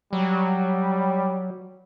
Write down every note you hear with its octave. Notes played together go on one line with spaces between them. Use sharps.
F#3 G3